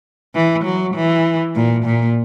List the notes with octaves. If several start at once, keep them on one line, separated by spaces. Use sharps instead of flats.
E3
F#3
E3
A#2
A#2